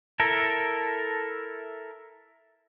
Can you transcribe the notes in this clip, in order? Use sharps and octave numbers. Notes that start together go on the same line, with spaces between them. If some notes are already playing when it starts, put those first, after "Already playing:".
E4 A4 A#4